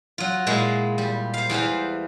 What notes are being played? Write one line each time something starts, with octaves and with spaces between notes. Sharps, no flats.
F#3 F4
A#2 G#3 E4 F4
G3
C5 F5
E2 E3 C5 F5